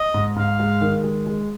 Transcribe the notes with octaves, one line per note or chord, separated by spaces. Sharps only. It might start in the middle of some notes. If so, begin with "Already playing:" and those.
Already playing: D#5
G#2
G#2 F5
G#3
D#3
G#3
G#3